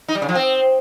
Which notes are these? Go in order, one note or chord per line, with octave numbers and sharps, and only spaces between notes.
D#4
G3
C#3
F3
C4